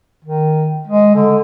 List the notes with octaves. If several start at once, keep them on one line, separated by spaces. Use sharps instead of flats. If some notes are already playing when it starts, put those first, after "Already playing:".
D#3
G#3
D3